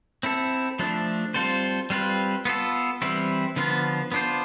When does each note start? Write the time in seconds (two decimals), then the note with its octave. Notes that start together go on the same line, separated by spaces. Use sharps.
0.23 C4 E4 A4
0.79 F3 A3 D4
1.34 G3 C4 F4 A4 C5
1.90 G3 C4 F4 B4
2.45 B3 F4 A4
3.02 E3 G3 C4 E4
3.56 D3 F3 B3 F4
4.12 B3 D4 F4 C5